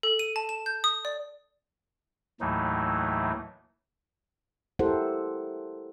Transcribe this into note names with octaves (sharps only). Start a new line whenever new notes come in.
A4
D#7
A5
E7
G6
D#6
D5
D#2 A2 E3 F#3 A3 D#4
E4 G4 A4 A#4 C5 F#5